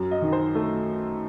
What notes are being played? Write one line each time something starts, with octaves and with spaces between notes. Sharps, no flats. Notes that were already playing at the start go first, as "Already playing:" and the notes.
Already playing: F#2
D#5
D#3
C5
A3